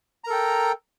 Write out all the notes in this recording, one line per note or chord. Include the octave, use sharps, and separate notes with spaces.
A4 A#4 G5 A#5